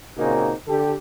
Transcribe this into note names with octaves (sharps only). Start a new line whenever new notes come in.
A#2 C#3 A#3 C4 D#4 F#4
D3 G4 A4